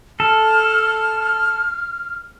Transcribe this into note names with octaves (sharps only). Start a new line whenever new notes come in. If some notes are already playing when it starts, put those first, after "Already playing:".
A4 F6